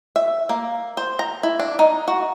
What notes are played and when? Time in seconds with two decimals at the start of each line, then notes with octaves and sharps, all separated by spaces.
0.16 E5
0.49 A#3
0.97 C5
1.19 A#5
1.43 E4
1.60 D4
1.79 D#4
2.08 F#4